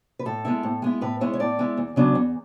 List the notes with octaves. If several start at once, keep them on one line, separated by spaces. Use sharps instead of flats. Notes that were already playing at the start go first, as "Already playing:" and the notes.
B4
A2 A4
G#3 B3 E4
A2
G#3 B3 E4
A2 B4
G#3 B3 E4 C#5
C#5
A2 D5
G#3 B3 E4
E2
C#3 F#3 B3 D4
E2